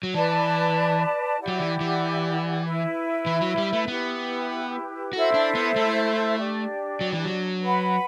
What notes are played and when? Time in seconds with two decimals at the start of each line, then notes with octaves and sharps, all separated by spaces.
0.03 F#3
0.14 E3 B4 D5 A5
1.39 E4 G4 D5 F#5
1.48 F#3
1.60 E3
1.81 E3
2.63 E4 B4 E5
3.26 E3
3.41 F#3
3.58 G3
3.73 A3
3.88 B3 E4 G4 B4
5.13 E4 F#4 A4 C5 E5
5.34 D4
5.55 B3
5.76 A3
6.38 D4 G4 D5
7.01 F#3
7.13 E3
7.25 F#3
7.63 B4 F#5 B5